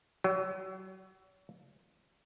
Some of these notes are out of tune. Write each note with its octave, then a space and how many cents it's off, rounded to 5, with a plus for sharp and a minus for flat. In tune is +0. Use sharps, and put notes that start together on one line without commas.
F#3 +35